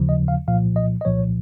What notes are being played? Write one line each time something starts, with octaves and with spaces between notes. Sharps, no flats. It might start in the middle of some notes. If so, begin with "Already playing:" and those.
Already playing: D#2 C#3 F3
D#5
F5
C2 A#2 F3 F5
D#5
D#5
C2 A#2 F3 C#5